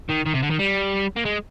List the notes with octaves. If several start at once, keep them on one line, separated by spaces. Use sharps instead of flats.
D#3
D#3
C3
D3
D#3
G3
A#3
G#3